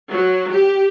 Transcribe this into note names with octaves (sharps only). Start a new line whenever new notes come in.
F#3
G4